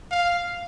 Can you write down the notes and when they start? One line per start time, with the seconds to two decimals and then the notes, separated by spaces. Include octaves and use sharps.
0.11 F5